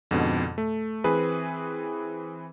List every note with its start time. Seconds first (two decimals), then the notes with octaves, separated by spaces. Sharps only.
0.11 F2 G#2 B2 D3
0.58 A3
1.04 E3 C4 G#4 B4